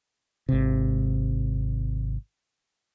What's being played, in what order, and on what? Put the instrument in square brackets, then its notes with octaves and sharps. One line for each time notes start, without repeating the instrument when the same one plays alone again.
[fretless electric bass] G#1 C3